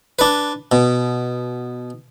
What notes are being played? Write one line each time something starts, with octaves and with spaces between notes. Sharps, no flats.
D4 B4
B2